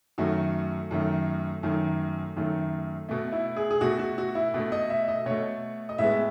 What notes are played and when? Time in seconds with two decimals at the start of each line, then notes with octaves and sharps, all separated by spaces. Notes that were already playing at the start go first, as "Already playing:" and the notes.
0.18 F#2 D#3 A3 F#4
0.91 F#2 D#3 A3
1.63 F#2 D#3 A3
2.36 F#2 D#3 A3
3.09 B2 A3
3.33 E4
3.56 G#4
3.71 G#4
3.81 B2 A3 F#4
3.99 F#4
4.18 F#4
4.35 E4
4.54 B2 A3
4.72 D#5
4.90 E5
5.08 D#5
5.26 B2 A3 C#5
5.89 D#5
5.98 A2 G#3 B3 E5